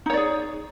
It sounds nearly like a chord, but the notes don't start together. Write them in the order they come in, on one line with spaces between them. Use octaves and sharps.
D#4 C#5 D5 G#4